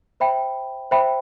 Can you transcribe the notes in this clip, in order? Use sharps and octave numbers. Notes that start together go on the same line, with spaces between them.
C5 E5 G5 B5
C5 E5 G5 B5